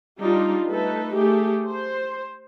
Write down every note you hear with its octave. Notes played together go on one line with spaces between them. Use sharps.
G3 D4 D#4 F4
A3 D#4 A4 B4
A3 G4 G#4
C5